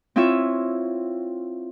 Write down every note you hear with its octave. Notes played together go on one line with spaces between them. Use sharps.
C4 E4 F4 C#5 E5